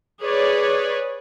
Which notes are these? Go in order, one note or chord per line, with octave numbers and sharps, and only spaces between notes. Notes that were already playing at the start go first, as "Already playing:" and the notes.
G#4 B4 C#5 D5